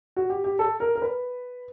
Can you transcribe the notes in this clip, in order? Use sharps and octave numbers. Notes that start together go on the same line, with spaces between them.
F#4
G4
G4
A4
A#4
A#4
B4